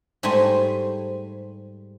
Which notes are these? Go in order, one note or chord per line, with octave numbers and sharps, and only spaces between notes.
G#2 G3 A3 C5 G#5